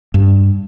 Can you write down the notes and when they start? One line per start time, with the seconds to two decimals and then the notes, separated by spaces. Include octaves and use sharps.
0.14 G2